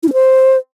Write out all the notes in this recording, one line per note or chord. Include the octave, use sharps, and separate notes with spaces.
E4
C#4
C5